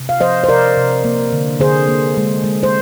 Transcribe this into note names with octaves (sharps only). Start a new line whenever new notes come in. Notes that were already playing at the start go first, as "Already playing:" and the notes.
Already playing: C3
F5
F3 C5 D#5
C5
C3 A#4 D5
C3
A#3
D3
D3 G#4 C5
A#3
G#3
G#3
C5